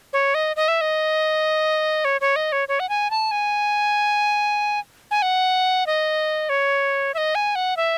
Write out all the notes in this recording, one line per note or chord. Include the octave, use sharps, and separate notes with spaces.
C#5
D#5
D#5
E5
D#5
C#5
C#5
D#5
C#5
C#5
F#5
G#5
A5
G#5
G#5
F#5
D#5
C#5
E5
D#5
G#5
F#5
E5